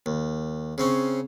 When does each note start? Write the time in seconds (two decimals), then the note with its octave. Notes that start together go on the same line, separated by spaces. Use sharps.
0.06 D#2
0.78 C#3 C4 C#4